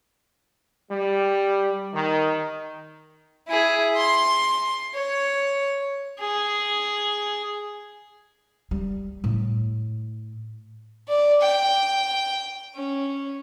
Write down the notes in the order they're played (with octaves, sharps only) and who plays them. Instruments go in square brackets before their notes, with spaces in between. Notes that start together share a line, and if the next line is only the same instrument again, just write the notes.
[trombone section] G3
D#3
[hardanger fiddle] E4 G#4
C6
C#5
[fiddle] G#4
[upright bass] G3
A2
[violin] D5
G5
C#4